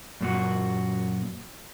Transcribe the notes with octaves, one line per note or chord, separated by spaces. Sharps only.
F#2 A#2 F#4